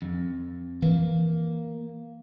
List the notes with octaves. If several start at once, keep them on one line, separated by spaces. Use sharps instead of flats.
F2
E3 A#3